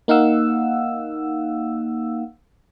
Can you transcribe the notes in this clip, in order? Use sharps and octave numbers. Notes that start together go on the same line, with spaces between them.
A#3 D#4 F5 F#5 E6